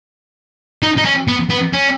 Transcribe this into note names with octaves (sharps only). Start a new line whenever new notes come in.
D#4
D#4
C#4
B3
B3
C#4